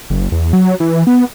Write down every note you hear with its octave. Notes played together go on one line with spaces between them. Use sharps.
F#1
E2
F#3
E3
B3